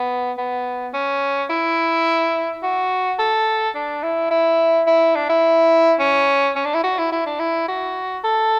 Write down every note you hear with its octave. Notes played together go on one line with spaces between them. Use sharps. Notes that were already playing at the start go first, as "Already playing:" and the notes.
Already playing: B3
B3
C#4
E4
F#4
A4
D4
E4
E4
E4
D4
E4
C#4
C#4
D4
E4
F#4
E4
E4
D4
E4
F#4
A4